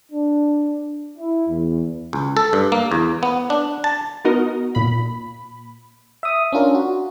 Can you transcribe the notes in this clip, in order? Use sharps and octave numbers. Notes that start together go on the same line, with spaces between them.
D4
E4
E2
C#2
A4
G2
A#3
E2
B3
D4
A5
B3 D#4 F#4 A#4 D#5
A#2 B5
E5 D#6
C#4 D4 F4 A#4
F#4